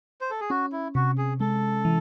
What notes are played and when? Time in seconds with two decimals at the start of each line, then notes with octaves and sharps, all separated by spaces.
0.21 C5
0.30 A4
0.41 G#4
0.50 C#4 F#4
0.72 E4
0.95 C3 F#4
1.18 G#4
1.40 G#3 A4
1.85 E3